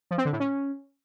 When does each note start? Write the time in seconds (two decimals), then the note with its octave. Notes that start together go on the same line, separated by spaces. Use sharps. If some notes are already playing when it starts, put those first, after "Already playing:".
0.11 F3
0.18 C4
0.25 D3
0.33 A2
0.40 C#4